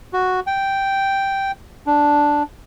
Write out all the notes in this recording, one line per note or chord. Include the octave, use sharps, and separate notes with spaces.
F#4
G5
D4